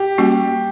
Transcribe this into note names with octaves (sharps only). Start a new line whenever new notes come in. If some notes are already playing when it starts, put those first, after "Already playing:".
Already playing: G4
G3 A#3 C#4 F#4